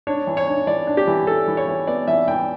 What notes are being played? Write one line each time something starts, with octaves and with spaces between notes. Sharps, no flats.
D4 C#5
E3
C#5
D4
E3 D5
D4
G4
E3
E3 A4
E3
C#5
E3
B3 D5
E3 E5
E3 G5